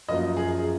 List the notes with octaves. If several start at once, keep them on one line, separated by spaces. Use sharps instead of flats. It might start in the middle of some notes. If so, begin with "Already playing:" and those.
F#2 F3 A#3 D#5
G#4